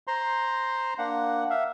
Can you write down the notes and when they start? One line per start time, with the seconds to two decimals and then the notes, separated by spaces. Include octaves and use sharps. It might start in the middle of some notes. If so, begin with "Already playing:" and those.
0.07 C5 A#5 C6
0.98 A#3 D4 F#5
1.50 E5 F5